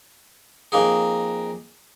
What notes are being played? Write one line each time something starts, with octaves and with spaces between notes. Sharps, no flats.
F2 A#3 D#4 G#4